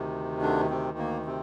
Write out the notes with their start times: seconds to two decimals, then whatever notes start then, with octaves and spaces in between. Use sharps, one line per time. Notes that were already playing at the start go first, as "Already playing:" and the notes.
Already playing: D2 C3 D#3
0.42 D3 D4
0.70 C3 C4
0.98 A#3
1.26 C3 C4